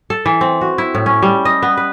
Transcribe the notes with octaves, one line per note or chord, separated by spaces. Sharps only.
A4
E3
C4
F#4
E4
A2
C#4
G3
D#5
B3
B4